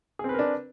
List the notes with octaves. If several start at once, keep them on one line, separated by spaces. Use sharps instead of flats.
C4 D4 G#4 A#4 B4